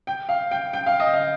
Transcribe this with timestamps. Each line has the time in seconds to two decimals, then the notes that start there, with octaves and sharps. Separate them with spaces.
0.07 G5
0.29 F5
0.51 G5
0.73 G5
0.86 F5
1.00 D#5
1.13 F5